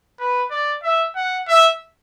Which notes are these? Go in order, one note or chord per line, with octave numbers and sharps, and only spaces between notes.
B4
D5
E5
F#5
E5